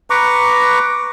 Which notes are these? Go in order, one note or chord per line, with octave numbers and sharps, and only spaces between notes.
B4 A#5 C#6 D6